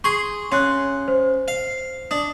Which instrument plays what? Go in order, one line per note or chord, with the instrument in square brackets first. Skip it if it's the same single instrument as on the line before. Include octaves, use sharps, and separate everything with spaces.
[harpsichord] G#4 C6 [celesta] C#6
[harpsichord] C#3 [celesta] C6 F#6
[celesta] C5
[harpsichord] F5
[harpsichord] D4 [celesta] D#6